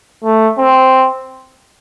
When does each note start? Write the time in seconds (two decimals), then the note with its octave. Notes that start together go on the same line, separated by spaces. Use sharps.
0.24 A3
0.58 C4